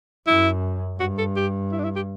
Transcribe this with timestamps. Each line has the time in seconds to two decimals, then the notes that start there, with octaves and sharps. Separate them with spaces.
0.27 F#2 E4
1.00 G2 F#4
1.18 A4
1.36 G4
1.71 E4
1.79 D4
1.84 E4
1.96 G4